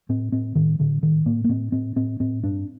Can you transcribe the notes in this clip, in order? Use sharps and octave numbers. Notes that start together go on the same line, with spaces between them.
A2 C4
A2 C4
A2 D#3
A2 D3
A2 D#3
A2 A#3
A#3
A2 C4
A2 C4
A2 C4
A2 C4
G2 D4